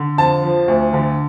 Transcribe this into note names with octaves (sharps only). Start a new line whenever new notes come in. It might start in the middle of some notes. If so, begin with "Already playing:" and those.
Already playing: D3
F2 A5
F3
D2
D3